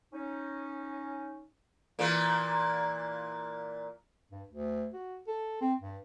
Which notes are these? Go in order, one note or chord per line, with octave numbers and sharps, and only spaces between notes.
C#4 D#4
A#2 E3 A#3
G2
D2
F#4
A4
C4
G2